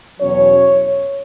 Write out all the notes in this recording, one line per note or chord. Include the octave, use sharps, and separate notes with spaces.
E2 B2 F#3 C#4 C#5